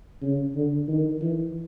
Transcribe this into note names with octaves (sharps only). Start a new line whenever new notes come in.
C#3
D3
D#3
E3